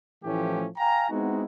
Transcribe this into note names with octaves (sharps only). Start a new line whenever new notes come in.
A2 E3 F3 A3 C#4 G4
F5 G5 G#5 A#5
G#3 B3 C4 D#4 E4 F#4